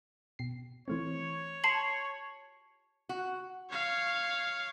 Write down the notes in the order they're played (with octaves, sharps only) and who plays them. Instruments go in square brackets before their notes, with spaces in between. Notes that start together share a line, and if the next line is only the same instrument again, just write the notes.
[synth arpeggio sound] B2 C7
[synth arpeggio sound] E3 A3 C4 [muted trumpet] C#5
[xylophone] A5 C7 F#7 [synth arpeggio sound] C6
[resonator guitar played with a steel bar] F#4
[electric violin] C#5 F5